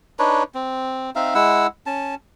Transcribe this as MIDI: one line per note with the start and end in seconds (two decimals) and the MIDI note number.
0.19 0.43 62
0.19 0.43 63
0.19 0.43 71
0.19 0.43 73
0.54 1.10 60
1.16 1.34 60
1.16 1.34 63
1.16 1.34 76
1.16 1.34 77
1.35 1.67 56
1.35 1.67 64
1.35 1.67 78
1.35 1.67 88
1.86 2.15 61
1.86 2.15 81